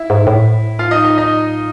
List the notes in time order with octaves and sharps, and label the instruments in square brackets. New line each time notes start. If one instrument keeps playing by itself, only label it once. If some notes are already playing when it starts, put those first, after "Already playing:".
Already playing: [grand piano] E4 E5
[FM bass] G#2
A2
[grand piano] F4 F5
D#4 D#5
D#4 D#5
D#4 D#5